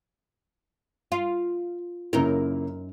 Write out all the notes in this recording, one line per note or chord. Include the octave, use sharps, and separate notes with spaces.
F4
F#2 C#3 A#3 D#4 E4 A#4